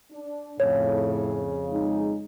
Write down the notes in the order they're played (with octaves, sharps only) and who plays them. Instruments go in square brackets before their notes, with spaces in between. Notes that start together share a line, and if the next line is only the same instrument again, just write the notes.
[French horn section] D4
[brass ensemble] F2 C#3 [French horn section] A2 [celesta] C#5
[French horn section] G#3 D#4